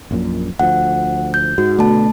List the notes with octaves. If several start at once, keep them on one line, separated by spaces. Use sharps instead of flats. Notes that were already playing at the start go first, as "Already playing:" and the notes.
A#1 F#2 A#2
D2 F3 F#5
G6
G#2 F#4
B2 D3 A3 A5